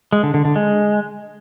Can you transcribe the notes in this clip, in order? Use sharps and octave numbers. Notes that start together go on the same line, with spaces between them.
G#3
D3
D3
D3
G#3